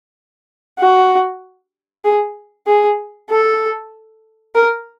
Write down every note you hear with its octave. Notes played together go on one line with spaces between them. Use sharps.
F#4
G#4
G#4
A4
A#4